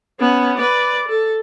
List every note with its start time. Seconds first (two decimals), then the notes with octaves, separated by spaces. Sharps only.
0.19 B3 C#4
0.58 B4 D5
1.08 A4